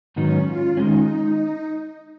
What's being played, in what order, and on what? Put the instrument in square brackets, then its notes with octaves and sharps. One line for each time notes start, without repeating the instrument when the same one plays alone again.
[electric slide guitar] G#2 D#3 F#3 B3 D#4 [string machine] C#4
[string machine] F4
[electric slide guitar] D#3 G#3 C#4 [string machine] D#4